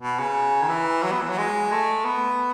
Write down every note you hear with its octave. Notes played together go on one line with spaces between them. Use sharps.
B2
C#3
D#3
E3
F#3
B3
E3
F#3
G#3
A3
B3